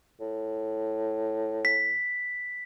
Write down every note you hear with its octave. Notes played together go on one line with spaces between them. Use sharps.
A2
B6